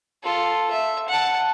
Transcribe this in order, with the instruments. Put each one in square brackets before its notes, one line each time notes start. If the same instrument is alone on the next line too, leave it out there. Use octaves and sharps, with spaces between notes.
[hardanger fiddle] F4 A4
E5
F#5 A5